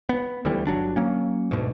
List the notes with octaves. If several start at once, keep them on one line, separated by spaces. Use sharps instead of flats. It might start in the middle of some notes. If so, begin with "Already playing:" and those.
B3
D2 D3 E3 G3
G1 F#3 D4
F#3 A#3 C#4
D2 G#2 B2